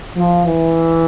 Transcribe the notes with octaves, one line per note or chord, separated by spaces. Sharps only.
F3
E3